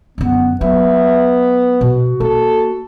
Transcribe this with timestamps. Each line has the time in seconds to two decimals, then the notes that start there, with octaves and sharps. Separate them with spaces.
0.18 F#2 D3 B3
0.61 F#3 B3 E5
1.81 B2 F#4
2.20 A#3 A4